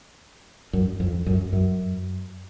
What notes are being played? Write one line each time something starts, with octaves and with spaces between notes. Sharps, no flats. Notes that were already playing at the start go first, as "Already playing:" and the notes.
F#2
F2
F#2
F#2